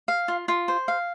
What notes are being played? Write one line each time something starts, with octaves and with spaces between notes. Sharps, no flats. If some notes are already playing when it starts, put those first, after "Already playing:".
F5
F4
F4
C5
F5